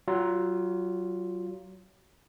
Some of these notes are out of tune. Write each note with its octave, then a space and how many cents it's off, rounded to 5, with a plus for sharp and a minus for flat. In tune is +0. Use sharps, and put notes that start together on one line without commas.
F#3 +25 F4 +0